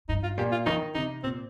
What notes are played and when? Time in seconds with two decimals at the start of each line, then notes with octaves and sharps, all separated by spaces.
0.09 G2 D#4
0.23 F4
0.37 A#2 G4
0.52 F4
0.66 D#3 D#4
0.95 C3 D#4
1.23 A#2 C4